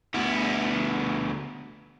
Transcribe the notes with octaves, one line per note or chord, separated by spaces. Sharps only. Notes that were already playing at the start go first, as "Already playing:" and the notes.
D2 B3